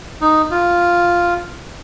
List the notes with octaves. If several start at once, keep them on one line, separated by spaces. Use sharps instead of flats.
D#4
F4